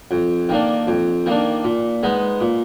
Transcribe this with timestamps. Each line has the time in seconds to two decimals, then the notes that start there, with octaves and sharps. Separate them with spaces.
0.11 F2
0.49 D#3 A#3 D4
0.87 F2
1.26 D#3 A#3 D4
1.64 A#2
2.03 G#3 B3 D#4
2.41 A#2